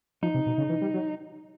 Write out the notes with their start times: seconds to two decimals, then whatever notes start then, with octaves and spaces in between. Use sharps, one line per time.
0.22 F3 D#4
0.34 C3
0.46 B2
0.58 C#3
0.69 E3
0.81 G3
0.94 F#3